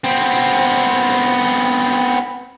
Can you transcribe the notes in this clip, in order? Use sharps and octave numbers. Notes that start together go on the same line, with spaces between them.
B3 C4